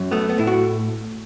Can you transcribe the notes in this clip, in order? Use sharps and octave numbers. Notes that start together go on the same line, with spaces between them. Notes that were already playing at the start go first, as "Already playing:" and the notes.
Already playing: F#2
A3 B3
B3
A2 E4
F#4